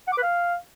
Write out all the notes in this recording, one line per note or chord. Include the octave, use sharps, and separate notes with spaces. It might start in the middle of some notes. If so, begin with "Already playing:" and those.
F#5
D6
B4
F5